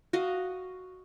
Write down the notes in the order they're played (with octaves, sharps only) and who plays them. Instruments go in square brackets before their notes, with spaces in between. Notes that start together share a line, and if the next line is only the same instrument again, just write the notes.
[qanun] F#4 D#5 F5